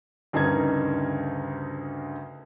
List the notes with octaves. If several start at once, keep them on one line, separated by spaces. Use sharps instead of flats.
D2 G2 C#3 D#4 A#4 G#6